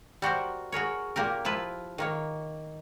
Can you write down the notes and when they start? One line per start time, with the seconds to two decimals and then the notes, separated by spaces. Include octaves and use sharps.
0.22 G3 F#4 A#4 C5
0.72 F#4 G#4 A#4 C#5
1.16 A#2 A#3 G4 A#4
1.45 F3 E4 F4 B4
1.98 D#3 A#3 C#5